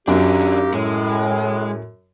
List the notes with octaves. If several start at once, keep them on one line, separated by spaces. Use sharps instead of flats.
F#2 D#3 A#3 D4 D#4 G4
A2 G#3